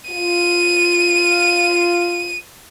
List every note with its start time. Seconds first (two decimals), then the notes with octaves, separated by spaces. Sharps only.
0.10 F4 D#7